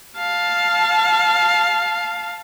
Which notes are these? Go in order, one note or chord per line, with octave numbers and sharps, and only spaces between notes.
F5 A5